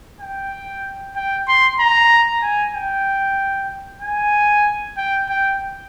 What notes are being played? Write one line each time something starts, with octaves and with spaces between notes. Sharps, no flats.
G5
G5
C6
A#5
G#5
G5
G#5
G5
G5